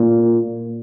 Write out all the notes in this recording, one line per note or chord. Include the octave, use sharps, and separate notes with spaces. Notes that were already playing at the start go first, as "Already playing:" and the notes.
Already playing: A#2